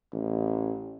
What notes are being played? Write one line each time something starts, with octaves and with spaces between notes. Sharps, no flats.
A1